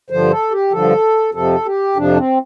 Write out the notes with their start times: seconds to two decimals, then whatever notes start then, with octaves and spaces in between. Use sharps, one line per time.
0.10 G2 D3 F3 C5
0.31 A4
0.51 G4
0.72 G2 D3 F3 A4
1.34 F2 C3 F3 A4
1.65 G4
1.96 F2 C3 F3 D4
2.17 C4